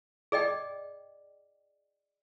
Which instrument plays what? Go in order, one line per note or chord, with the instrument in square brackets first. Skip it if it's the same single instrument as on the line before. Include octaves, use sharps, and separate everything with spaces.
[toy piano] G#4 D5 D#5 G5